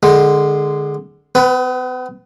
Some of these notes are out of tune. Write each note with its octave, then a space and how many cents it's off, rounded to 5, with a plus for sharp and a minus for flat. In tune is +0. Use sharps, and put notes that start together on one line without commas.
D3 +20 G#3 +0
B3 +40 B4 +0